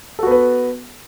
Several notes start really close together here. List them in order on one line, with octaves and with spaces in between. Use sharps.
A4 F#4 B3 B4